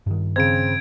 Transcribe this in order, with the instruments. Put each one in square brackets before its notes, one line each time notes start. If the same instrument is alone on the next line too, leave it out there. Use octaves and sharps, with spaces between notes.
[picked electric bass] G2 D#3
[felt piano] C#3 C4 [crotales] G#6 D7